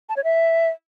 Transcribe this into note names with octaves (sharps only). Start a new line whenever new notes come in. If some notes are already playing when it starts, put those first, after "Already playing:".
A5
C#5
E5